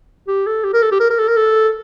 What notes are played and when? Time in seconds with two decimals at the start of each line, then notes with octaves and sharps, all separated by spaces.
0.28 G4
0.47 A4
0.64 G4
0.74 A#4
0.83 A4
0.92 G4
1.00 A#4
1.10 A#4
1.19 A4
1.28 A#4
1.37 A4